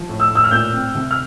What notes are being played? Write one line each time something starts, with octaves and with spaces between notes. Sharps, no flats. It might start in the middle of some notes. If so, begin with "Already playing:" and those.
Already playing: F3
A2
E6
A2
E6
F6
A#2 G6
C4
C2
F6